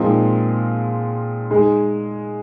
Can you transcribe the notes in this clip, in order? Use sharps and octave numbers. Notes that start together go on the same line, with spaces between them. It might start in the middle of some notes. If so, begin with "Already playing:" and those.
Already playing: A#2 F3 G#3 C4 D#4
G#3 D#4 G#4